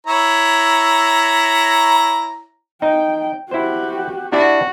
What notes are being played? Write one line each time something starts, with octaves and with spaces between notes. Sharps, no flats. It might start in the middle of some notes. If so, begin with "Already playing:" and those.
E4 C#5 A#5
D#4 G5
E4 F#4 G4 C5
D4 E4 F#4 G4